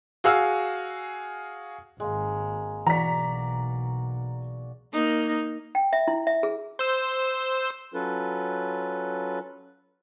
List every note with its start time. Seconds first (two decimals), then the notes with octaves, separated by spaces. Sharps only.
0.24 F#4 G#4 F5 E6 F6
2.00 G#1 G#3 A#3
2.87 B1 E3 F#4 D5 A#5 C#6 B6
4.93 A#3 D#4
5.75 G5
5.93 E5
6.08 E4
6.27 E5
6.43 G#4
6.79 C5 E6
7.94 F#3 C#4 F4 A4 B4